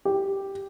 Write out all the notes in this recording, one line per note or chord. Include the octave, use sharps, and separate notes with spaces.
G4